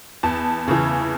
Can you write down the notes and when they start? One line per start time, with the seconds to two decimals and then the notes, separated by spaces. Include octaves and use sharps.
0.23 E2 A5
0.68 C#3 E3